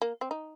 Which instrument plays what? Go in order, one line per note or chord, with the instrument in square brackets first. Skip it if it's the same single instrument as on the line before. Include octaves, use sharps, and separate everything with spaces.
[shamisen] A#3
C4
D#4